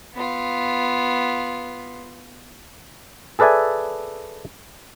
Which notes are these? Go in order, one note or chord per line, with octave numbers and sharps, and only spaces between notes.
B3 F4
G#4 A4 B4 D5 E5 G#5